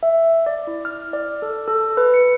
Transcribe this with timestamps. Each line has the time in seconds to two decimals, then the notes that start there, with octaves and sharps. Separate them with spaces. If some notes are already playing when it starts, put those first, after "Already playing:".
0.03 E5
0.46 D5
0.67 E4
0.85 F6
1.13 D5
1.42 A4
1.68 A4
1.97 B4
2.14 C#7